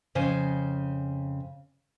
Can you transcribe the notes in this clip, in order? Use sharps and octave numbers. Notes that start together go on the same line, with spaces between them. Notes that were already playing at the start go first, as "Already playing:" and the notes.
F2 C#3 C5 G#5